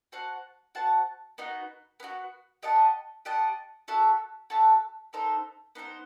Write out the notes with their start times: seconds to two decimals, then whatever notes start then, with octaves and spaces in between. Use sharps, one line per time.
0.12 F#4 C5 F#5 A5
0.75 F#4 C5 F#5 A5
1.38 B3 D#4 F#4
2.00 B3 D#4 F#4
2.63 G4 D#5 F#5 A5
3.25 G4 D#5 F#5 A5
3.88 F#4 A4 E5 A5
4.50 F#4 A4 E5 A5
5.13 B3 D#4 A4 C5
5.75 B3 D#4 A4 C5